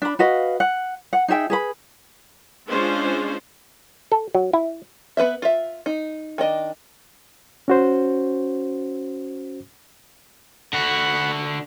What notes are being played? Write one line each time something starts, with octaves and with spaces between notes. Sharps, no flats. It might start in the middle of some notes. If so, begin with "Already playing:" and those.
D4 B5
F#4 B4 D#5 F5
F#5
F#5
D#4 G#4 E5 G5
G#4 B4 B5
G#3 C#4 D4 F4 C5
A4
F#3
E4
B3 B4 C5 E5
F4 E5
D#4
D#3 D4 D#5
C#4 F#4 C5
D3 F#4 F#5 B5